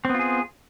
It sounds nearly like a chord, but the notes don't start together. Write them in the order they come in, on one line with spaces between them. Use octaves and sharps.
C4 B3 F4 G#4